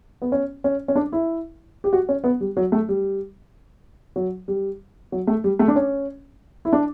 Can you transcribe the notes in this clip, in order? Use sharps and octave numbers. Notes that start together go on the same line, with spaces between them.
B3
C#4
C#4
C#4
D4
E4
G4
F#4
C#4
B3
G3
F#3
A3
G3
F#3
G3
F#3
A3
G3
A3
D4
C#4
E4
D4